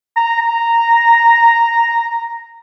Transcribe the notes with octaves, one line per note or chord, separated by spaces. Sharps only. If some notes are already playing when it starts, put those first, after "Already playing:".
A#5
A#5